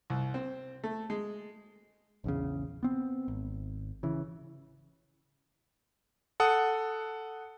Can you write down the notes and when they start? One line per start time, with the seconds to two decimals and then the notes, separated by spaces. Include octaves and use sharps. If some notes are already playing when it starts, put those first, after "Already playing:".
0.10 C2
0.34 C4
0.84 A3
1.10 G#3
2.24 A#1 E2 C#3
2.83 B3 C4
3.28 G#1
4.03 C#3 E3
6.40 A4 F#5 D#6